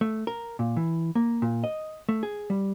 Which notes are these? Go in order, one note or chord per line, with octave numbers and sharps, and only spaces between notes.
A3
A#4
A#2
E3
A#3
A#2
D#5
A3
G#4
G3